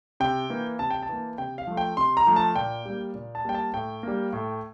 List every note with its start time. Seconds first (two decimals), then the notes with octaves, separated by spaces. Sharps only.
0.20 C3 G5
0.50 E3 A#3
0.79 C3 A5
0.90 G5
1.03 A5
1.09 E3 A#3
1.38 C3 G5
1.58 F5
1.67 F3 A3
1.77 G5
1.97 C3 C6
2.17 A#5
2.26 F3 A3
2.36 A5
2.56 A#2 G5
2.85 G3 A#3
3.15 A#2
3.35 A5
3.45 G3 A#3 G5
3.55 A5
3.74 A2 G5
4.03 G3 A#3
4.33 A2